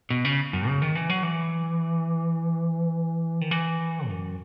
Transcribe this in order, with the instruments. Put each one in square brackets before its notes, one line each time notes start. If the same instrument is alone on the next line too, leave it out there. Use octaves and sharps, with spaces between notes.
[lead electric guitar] B2
C#3
F#2
C#3
D#3
E3
F#3
E3
D#3
E3
F#2